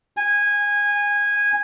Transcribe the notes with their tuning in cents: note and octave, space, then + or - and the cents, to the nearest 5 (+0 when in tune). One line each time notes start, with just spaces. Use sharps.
G#5 -15